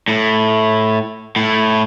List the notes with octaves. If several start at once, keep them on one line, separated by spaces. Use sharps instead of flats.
A2
A2